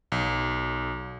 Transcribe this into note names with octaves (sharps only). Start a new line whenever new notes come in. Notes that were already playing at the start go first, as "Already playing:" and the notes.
B1